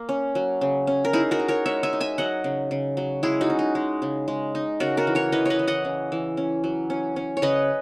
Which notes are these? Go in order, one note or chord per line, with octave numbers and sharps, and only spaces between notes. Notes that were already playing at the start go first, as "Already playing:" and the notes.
Already playing: A#3
C#4
F#3
C#3
C#4
A#4
D#4 E4 G#4
F#4 A#4
D#4
A#4 C#5
G#3 C#5 E5
E5 G#5
D#4
E5 G#5
F#3 D#5 F#5
C#3
C#3
F#3
G#3 E4 G#4
D#4 F#4
C#4
D#4
G#3
C#3
G#3
D#4
C#3 F#4 A#4
F#4 A#4
E3
A#4 C#5
E3 B4 D#5
B4 C#5 D#5
E3
D#5 F#5
C#3
E3
C#4
F#3
C#4
C#4
C#5
C#3 B4 D#5